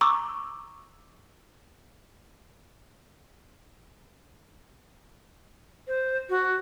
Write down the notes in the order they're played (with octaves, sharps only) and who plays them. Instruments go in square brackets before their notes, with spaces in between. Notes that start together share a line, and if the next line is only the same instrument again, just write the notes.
[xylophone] A#5 C#6 D6 E6
[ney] C5
F#4